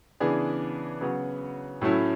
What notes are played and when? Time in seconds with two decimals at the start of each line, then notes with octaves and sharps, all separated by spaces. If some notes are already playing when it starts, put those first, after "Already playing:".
0.20 C#3 E3 B3 D4 G#4
1.01 C#3 F#3 B3 F#4
1.82 A2 F#3 A3 C#4 E4